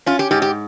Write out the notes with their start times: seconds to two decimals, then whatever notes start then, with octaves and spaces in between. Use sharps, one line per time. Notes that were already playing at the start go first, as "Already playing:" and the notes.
0.06 C#4 F4
0.19 G4
0.31 G#2 G4
0.42 G4